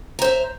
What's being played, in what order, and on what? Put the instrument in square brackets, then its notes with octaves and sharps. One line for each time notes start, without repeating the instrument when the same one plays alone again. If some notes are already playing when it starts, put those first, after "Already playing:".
[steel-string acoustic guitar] A#5
C5
E5